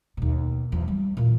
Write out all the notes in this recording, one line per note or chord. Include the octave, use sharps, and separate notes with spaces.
D#2 B2
E2 F3
G3
A#2 E3